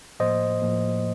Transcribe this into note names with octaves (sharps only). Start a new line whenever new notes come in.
A2 F3 A#3 C5 D#5
A2 F3 A#3